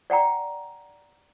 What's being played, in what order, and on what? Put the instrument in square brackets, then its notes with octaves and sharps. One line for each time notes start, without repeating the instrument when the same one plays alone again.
[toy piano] D5 F#5 G5 A#5